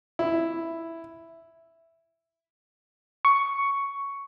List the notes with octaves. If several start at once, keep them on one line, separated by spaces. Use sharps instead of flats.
E4
C#6